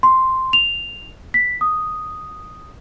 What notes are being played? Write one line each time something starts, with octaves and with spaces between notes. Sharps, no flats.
C6
F7
B6
D#6